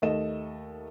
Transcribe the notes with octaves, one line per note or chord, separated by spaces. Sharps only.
D#2 A3 D#5 E7